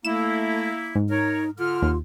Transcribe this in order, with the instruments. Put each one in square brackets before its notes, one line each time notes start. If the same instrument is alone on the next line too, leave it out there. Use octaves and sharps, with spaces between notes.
[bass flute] A3 [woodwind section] A#3 E4 [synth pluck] E7
[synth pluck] G#2
[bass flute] D#4 [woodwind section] A#4 C#5
[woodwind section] D3 F6 [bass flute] F4
[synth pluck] D#2